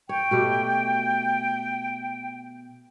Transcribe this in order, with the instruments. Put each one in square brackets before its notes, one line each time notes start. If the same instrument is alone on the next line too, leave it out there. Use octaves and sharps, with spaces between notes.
[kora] C#5 [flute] G5
[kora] B2 A3 G4